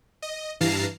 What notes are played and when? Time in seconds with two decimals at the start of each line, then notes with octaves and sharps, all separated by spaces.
0.22 D#5
0.61 G2 E3 F5 A5 A#5 C7